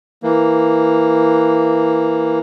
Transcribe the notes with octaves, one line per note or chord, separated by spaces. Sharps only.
E3 A#3